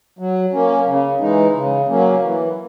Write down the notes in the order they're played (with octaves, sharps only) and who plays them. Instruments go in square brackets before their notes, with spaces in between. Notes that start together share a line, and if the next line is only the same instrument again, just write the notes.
[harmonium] F#3
A#3 C#4
C#3
E3 G#3 D#4
C#3
F#3 A#3 C#4
E3